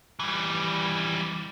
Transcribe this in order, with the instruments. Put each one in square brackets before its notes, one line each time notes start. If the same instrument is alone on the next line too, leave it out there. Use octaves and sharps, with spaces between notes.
[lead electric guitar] E3 G3